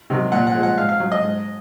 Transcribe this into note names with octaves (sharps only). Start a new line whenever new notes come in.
C3 D#3 F#3
A#2 F#5
F#5
F3 G#3
F#5
G#2 F5
F5
F#3
D#5
G#2